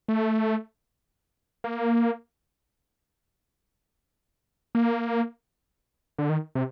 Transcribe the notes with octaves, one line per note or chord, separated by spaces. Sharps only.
A3
A#3
A#3
D3
D#3
C3